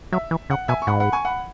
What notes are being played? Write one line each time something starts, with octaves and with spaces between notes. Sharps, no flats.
F#3 E5
E3
C#3 F#5
B2 E5 G#5
C#6
G#2 F#5 B5
F#5 B5
G#5 C#6
F#5 B5